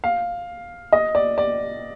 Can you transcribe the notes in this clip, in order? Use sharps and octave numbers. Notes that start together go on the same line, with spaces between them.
F5
D#5
D5
D5